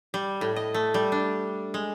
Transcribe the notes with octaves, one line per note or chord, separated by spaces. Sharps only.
G3
A2
D#5
A3
G3
D4
G#3